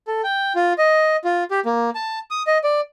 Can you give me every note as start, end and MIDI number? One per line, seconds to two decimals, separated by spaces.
0.07 0.22 69
0.24 0.53 79
0.55 0.73 65
0.78 1.17 75
1.24 1.44 65
1.51 1.60 67
1.65 1.90 58
1.95 2.19 81
2.31 2.43 87
2.47 2.58 75
2.64 2.81 74